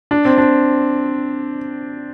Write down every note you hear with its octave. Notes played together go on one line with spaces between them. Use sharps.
D4
C4
D4